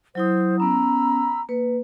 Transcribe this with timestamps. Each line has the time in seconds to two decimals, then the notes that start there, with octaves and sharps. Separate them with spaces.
0.15 F#3 E4 C5 D#6
0.60 B3 C#4 A#5 B5 E6
1.49 A#3 B4